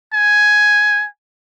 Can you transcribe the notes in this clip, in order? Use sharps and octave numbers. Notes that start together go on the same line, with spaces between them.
G#5